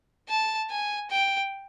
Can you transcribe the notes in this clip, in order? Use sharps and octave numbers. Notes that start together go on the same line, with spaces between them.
A5
G#5
G5